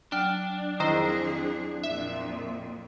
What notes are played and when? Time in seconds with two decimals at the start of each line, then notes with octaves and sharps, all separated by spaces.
0.12 F#3 D4 G5 F6
0.80 F2 D#3 E4 G#4 C5 A#6
1.83 F2 A#2 E5